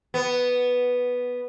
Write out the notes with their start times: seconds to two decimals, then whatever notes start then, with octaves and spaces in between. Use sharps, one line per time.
0.14 B3